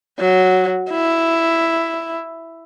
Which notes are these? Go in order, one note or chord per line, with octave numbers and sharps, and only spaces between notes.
F#3
E4